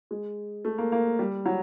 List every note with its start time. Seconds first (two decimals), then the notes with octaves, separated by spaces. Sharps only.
0.11 G#3
0.65 A3
0.78 A#3
0.92 A#3
1.19 G3
1.46 F#3